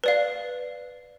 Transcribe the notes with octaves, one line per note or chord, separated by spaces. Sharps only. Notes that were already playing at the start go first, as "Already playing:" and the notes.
B4 D5 F5